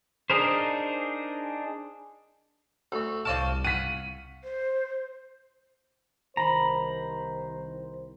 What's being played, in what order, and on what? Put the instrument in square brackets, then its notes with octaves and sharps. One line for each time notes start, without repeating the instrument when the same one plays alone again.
[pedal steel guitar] D4 D#4 G#4 A#4 C5
[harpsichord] D2 [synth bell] C#6 E6
[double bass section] C2 [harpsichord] C5 D5 A5 [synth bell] F5 C#6 F6
[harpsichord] F#5 [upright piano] B6 D#7
[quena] C5
[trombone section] C2 D#3 C5 [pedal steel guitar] A#5 B5